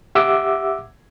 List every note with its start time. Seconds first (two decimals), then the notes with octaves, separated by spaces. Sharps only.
0.15 G4 E5 F#5 D6 E6